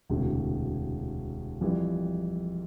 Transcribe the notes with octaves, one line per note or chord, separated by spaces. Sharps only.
E1 D2 C3
F2 E3 G3